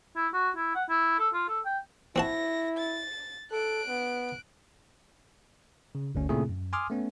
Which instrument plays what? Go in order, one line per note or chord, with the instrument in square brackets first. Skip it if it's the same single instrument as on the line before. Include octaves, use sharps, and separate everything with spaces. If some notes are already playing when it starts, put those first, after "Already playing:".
[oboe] E4
F#4
E4
F#5
E4
A4
F4
A4
G5
[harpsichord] C4 F#4 A5 [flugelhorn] E4 [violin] A#6
[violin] A6
[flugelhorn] A4 [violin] F#6 D7
[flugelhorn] B3
[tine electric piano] C#3
G1 D2 C#4
A#2 C#3 A3 C4 E4 G#4
F#2
G#5 C6 D6 D#6 F6
A3 B3 C#4